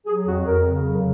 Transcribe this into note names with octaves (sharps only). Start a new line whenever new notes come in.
F#3 G#4
F2 F#4
F2 A#4
C#3
F#3